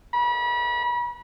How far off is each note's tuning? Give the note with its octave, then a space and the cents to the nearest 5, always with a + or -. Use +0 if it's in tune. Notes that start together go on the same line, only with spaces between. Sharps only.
B5 -35